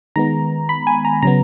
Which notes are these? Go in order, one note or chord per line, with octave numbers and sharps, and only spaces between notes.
D#3 G#3 B3 A#5
B5
G#5
A#5
C#3 F#3 B3 A#5